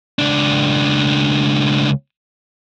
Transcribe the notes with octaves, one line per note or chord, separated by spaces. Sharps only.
C#2 D4